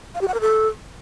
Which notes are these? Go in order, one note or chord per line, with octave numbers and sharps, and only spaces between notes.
F5
G4
F#5
A#4
A4